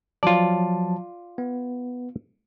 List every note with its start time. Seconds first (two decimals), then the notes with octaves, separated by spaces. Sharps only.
0.23 F3 F#3 F4 D5 A5
1.38 B3